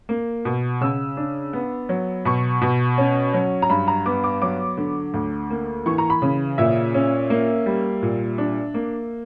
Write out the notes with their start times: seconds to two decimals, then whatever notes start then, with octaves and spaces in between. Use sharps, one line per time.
0.09 A#3
0.45 B2
0.81 C#3 E6
1.17 D4
1.53 B3
1.89 F#3
2.25 B2 C#6
2.62 B2
2.98 C#4
3.34 F#3
3.62 A#5
3.69 G2 B5
3.88 A#5
4.06 B3 D6
4.24 D6
4.42 F#3 D6
4.77 D3
5.14 D2
5.50 A#3
5.86 E3 C#6
5.98 A#5
6.10 B5
6.22 C#3
6.58 A#2 E5
6.94 C#4
7.30 A#3
7.66 G3
8.02 A#2
8.38 D4
8.74 A#3